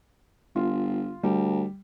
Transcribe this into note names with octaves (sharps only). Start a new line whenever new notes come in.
G1 F4
D2 G3